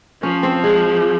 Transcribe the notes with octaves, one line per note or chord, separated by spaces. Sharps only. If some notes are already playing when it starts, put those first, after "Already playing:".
F3 C#4
C4
G#3